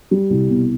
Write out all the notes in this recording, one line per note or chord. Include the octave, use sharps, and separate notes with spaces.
G3
C2
B2